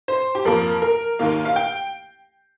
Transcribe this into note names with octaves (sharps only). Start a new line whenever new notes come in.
C5
G4
F2 F3 A#3 A#4
A#4
D#2 D#3 A#3 F5
F5
G5